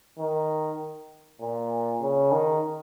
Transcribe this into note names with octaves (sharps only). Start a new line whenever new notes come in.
D#3
A#2
C#3
D#3